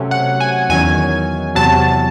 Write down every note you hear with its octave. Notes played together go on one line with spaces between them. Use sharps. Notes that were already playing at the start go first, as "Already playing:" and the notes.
Already playing: C3 F#3 A3 C#4
F#5
G#5
E2 D#3 F#3 C#4 G#5
E2 C3 F#3 A5